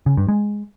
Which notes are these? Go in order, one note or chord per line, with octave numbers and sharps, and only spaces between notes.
C#3
G2
G#3